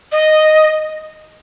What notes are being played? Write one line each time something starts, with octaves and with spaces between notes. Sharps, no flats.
D#5